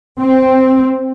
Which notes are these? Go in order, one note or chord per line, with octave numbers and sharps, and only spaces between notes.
C4